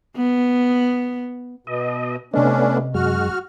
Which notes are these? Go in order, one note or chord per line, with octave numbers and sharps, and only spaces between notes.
B3
B2 D#5
C3 A3 B3 C#4 D4 D#5
F#2 G#3 F#4 F6